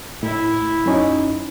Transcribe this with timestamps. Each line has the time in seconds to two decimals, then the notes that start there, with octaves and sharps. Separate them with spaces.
0.23 A2 E4
0.86 F#2 C#4 D#4